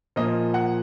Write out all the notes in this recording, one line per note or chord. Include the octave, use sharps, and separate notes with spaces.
A#2 F3 A#3 D#5
F#5